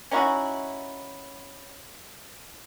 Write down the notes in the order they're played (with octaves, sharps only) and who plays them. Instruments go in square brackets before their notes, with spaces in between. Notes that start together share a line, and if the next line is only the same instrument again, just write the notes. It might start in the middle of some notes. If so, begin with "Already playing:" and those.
[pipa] C#4 D#4 E4 F#4